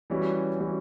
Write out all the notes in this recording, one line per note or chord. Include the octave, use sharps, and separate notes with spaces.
E3 G3 C#4 F#4
E3 G3 C#4 F#4